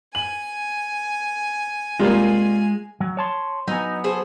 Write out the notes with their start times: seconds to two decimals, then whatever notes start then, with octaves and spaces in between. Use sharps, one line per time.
0.15 G#5 F#7
2.00 C3 G3 G#3 A#3 F4 F5
3.00 F#3
3.17 C#5 A5 C6
3.68 F#3 B3 D#4 G#5
4.04 G#4 A4 C5